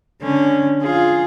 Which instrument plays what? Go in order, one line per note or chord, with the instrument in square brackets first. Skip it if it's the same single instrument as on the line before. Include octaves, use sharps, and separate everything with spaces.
[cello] D3 C#4
F4 G#4